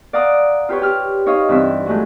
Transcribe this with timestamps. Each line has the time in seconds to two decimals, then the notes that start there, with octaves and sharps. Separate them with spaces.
0.13 D5 F5 F#5 A#5 D#6
0.69 F4 G4 B4 C#5
0.81 G4 F6
1.26 D#4 C#5 D#5 F5
1.49 G2 E3 C4 E5 E6
1.86 F#3 G#3 A3